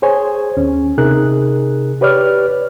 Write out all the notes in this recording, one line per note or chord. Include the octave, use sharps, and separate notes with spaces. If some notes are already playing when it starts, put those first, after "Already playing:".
G#4 C5 C#5 G#5
D#2 C#4
C3 D#4 G#4 A#4 F#6
G4 B4 C#5 D5 F6